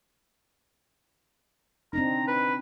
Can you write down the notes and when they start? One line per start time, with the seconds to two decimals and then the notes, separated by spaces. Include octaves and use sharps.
1.93 C4 D4 D#4 A#5
2.27 B4